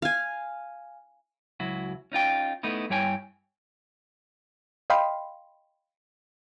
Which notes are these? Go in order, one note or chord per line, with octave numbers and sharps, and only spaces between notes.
F5 G#5
C#2 F#3 E4 F#4
C#4 D#4 F4 G5
A3 B3 D#4 E4
G2 G3 E4 C#5 G5 G#5
D#5 F5 G5 B5 C6